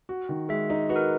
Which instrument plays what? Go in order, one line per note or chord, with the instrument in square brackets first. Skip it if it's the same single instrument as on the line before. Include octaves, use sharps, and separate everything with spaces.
[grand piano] F#4
D#3
[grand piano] G#3 [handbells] E5
[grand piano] D#4
[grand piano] F#4 [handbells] B4
[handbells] A#4